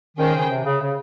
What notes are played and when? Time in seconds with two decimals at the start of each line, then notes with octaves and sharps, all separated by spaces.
0.17 D#3 C#4 G#4 C5 G5
0.34 C#3
0.49 C3
0.65 C#3
0.81 C#3